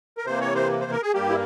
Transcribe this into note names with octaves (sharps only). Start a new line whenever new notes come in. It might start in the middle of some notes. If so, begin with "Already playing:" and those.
A#4
C3 E3 A#3 C5
C#5
C5
C5
A#4
G#4
G2 G3 A#3 G4
E4